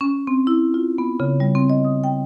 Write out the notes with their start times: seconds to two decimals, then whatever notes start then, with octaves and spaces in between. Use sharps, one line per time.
0.01 C#4
0.27 C4
0.47 E4
0.74 F4
0.98 B3
1.20 C#3
1.40 G3
1.55 C4
1.70 D#5
1.84 D#6
2.04 G5